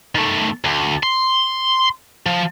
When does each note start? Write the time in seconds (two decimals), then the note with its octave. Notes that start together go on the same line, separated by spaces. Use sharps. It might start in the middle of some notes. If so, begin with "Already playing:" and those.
0.15 D#3 A3
0.64 D2
1.03 C6
2.26 F3